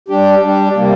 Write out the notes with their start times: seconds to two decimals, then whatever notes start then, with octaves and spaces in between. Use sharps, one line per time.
0.08 G3 D4 G4
0.41 G3 D4 G4
0.76 C3 G3 A#3